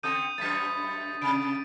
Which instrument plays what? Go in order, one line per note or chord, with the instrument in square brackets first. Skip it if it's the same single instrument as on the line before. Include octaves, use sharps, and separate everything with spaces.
[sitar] D3 C4 A4 [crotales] D#6 G6 D#7
[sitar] F#2 A2 [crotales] A6 B6
[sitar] C3 [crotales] D7